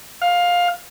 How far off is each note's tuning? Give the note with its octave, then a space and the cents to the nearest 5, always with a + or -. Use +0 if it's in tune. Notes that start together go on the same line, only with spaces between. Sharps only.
F5 +15